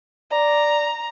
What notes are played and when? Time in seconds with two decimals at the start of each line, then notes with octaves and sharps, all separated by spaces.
0.32 D5 A#5